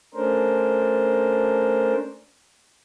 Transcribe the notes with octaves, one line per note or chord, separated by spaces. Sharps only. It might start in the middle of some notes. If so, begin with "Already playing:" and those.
A3 C#4 D4 A#4 C5